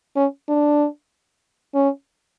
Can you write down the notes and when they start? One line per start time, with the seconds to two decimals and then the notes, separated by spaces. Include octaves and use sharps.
0.16 C#4
0.49 D4
1.74 C#4